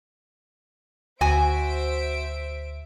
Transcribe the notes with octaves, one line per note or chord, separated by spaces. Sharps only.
D2 F#4 C5 E5 G#5 D7